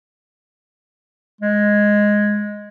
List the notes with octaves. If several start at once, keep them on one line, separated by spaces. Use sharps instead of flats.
G#3